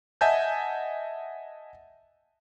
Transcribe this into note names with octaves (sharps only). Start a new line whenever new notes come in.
D#5 E5 F#5 G#5 A5 G6